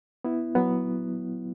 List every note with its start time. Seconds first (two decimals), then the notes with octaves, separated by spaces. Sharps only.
0.24 B3 E4
0.55 F#3 B3